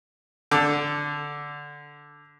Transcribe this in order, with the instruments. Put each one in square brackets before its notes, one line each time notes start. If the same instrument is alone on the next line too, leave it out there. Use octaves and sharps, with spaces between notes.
[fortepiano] D3 A4 D6